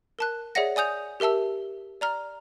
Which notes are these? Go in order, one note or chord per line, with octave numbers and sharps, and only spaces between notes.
A#4 A5 F#6
G#4 C#5 D5 E5 F#5 A#6
D5 G#5 D#6 G6 F7
G4 A#4 E5 A5 E6
D5 A#5 F6